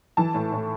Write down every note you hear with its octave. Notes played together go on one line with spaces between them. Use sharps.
E3 A5
A2
A2